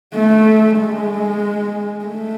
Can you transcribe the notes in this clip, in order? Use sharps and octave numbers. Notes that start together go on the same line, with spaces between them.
A3
G#3
A3